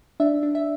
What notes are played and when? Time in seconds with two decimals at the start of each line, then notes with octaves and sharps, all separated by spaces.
0.20 D4 E5
0.43 D4
0.55 E5